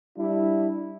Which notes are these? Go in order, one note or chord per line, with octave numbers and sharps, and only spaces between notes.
G3 D4 E4